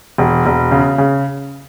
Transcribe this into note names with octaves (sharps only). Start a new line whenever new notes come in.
E1
E1
C#3
C#3